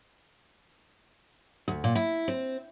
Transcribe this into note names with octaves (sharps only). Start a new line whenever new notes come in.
D2
A#2
E4
C4